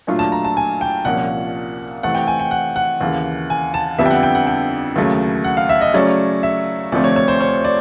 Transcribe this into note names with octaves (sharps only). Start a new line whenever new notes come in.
A#2 F#3 A3 D4 F4
A5
A#5
A5
G#5
G5
C2 A#2 F3 A#3 C#4 F#5
C3 E3 A3 C4 F#5
G5
G#5
G5
F#5
F#5
D#2 C#3 E3
G#5
A5
F2 D3 G3 B3 D4 E5
G5
F#5
G5
F#5
G5
D#2 C#3 F#3 A3
F#5
F5
E5
D#5
C#3 F#3 A3 C#4 D5
E5
D2 C3 F3 A3 C4 D5
C#5
C#5
C5
C#5
D5